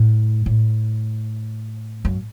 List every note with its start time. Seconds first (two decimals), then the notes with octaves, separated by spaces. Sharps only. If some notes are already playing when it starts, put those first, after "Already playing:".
Already playing: A2
0.46 A2
2.05 F#2